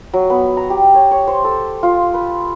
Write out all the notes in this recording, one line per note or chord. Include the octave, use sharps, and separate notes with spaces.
F#3
B3
A#5
G4
C#5
C#5
C5
A4
F4
B4